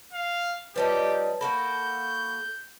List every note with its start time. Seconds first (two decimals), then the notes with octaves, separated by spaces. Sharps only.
0.13 F5
0.76 F3 G3 D#4 G4 B4 C#5 A5
1.41 A#3 F#4 A4 B5 G6